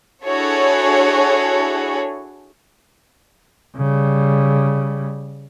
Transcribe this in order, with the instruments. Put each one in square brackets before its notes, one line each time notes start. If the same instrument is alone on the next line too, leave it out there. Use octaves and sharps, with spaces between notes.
[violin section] D4 E4 F#4 G#4 A4 C#5
[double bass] C#3 G3